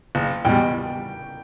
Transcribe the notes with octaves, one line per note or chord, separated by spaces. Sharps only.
F#1
E2 B2 G3 G5